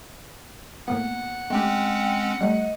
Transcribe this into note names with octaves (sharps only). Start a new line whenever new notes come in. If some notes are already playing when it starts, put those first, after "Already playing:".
A2 A#3 B3 F#5
G#3 A3 C4 C#4 G4 G5
G3 A3 D#5